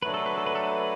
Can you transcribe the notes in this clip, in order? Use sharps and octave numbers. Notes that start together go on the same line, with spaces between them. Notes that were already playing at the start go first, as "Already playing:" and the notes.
F#3 A3 D4 B4
A4
B4
A4
B4
A4
B4